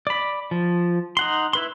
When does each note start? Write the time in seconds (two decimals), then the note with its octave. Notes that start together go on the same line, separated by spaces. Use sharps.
0.07 D5 B5
0.51 F3
1.17 D#4 F#5 C6
1.53 E4 B4 C6